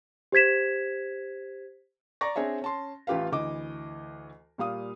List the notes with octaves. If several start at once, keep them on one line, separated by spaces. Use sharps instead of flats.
G4 C5 G#6 B6 E7
D5 A#5 C#6 A#6
C4 D4 G#4 C#5 E5
C#4 A5 C6
A1 F4 G4 B4 F5
D2 E3 D#5 D6
A#2 G3 F5 D#6